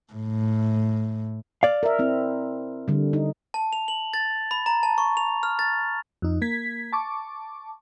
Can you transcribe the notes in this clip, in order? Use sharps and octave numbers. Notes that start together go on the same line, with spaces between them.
A2
D5 F5
A#4 E5
C4 E4
D3 G3
D#4
A5
F7
F#7
A6
B5
A#5
A5
C#6
F7
F6
A6
F2 D#4
A#3 G#6 B6
A5 C#6 D6